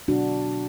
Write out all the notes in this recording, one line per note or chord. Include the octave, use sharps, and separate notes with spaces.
B2 F#3 B3 D4 F#4